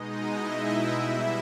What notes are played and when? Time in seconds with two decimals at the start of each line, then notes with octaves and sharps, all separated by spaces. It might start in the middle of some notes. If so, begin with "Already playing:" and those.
Already playing: B2 G#3 D#4 D#5
0.36 E4 E5
0.93 B2 G3